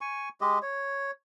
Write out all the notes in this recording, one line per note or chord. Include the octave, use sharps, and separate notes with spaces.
G#5 C#6
G#3 G4 D#5
C#5